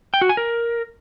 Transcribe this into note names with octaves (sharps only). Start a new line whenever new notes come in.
G5
F#4
G#5
A#4